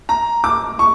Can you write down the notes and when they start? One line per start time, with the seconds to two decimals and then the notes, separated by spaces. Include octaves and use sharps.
0.09 A#5
0.44 D6
0.79 C#6